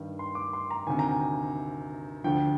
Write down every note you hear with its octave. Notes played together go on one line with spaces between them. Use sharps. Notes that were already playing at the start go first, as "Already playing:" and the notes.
Already playing: G2 D#3
C6
D6
C6
A#5
D2 C3 D#3 G#5
A#5
G#5
D2 D3 F3 G5